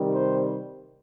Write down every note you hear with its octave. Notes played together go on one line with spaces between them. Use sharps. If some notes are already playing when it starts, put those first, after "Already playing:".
Already playing: C3 D#3 G3
C5